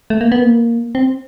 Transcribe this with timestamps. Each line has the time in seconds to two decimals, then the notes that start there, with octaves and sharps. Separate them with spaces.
0.10 A3
0.21 A#3
0.32 B3
0.42 A#3
0.95 C4